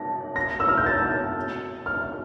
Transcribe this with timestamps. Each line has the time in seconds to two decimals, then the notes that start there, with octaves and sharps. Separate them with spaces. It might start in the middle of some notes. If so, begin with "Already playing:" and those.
Already playing: A5 A#6
0.36 A#6
0.60 E6
0.68 F6
0.77 G6
0.86 A6
1.86 F6